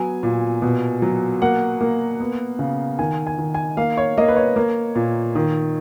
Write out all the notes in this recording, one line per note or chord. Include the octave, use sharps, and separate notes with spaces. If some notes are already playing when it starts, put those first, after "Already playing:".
Already playing: F#3 B3 G#5
A#2
B2
F#3
A#3 F#5
A#3
B3
C#3
D#3 G#5
G#5
D#3
G#5
A#3 F5
C#5
A#3 D#5
B4
C#5
A#3
A#2
D#3